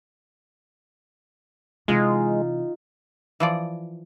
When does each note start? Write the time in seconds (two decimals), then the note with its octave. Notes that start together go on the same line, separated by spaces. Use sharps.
1.88 C3 E3 G#3 D#4 F4
3.40 E3 F3 D5